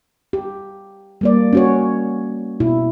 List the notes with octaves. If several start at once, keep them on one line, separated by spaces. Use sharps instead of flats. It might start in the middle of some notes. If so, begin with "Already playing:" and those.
G4
G3 A#3 D5
C#4 F#4 C#5
B2 E4